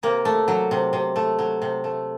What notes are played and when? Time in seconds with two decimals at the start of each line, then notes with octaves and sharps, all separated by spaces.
0.03 C3 A#3
0.25 A3
0.48 F#3
0.71 C3
0.93 C3
1.16 A3
1.39 F#3
1.62 C3
1.84 A3